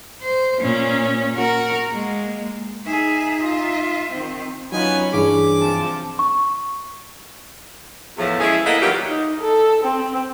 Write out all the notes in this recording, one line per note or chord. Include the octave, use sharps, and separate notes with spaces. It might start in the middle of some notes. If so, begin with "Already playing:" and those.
C5
A#2 C#4
F#4 A#4
G#3 A#3
D#4 G#4 E5
F4 E5
D#3 C4
F#3 B3 C#4 D#4 F4 G#5 B5
G2 E3 D4 G#4 D6
C3 F3 A5
C#6
E2 A2 F3
G#3 C#4 E4 G#4 A4
A#3 B3 E4 G#4 A4 D#5
D#3 E3 F#3 G3 F4 G4
D#4
A4
C4